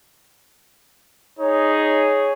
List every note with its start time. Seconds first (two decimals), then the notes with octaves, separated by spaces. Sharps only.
1.39 D#4 G#4 C#5